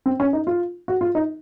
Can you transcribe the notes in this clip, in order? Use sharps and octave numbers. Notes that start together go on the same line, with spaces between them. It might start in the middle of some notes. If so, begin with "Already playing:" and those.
C4
C#4
D#4
F4
F#4
F4
D#4